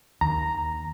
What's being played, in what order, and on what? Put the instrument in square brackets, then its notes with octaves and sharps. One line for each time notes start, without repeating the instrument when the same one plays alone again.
[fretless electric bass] D#2 [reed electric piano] A#5